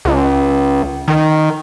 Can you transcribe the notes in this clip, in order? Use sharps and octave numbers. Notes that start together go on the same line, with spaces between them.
C#2
D#3